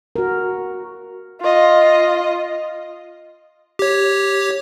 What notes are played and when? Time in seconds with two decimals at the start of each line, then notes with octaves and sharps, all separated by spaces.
0.16 F#4 A#4
1.41 F4 D#5
3.79 G4 C#5